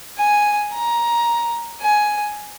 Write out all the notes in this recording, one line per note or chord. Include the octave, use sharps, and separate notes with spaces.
G#5
A#5
G#5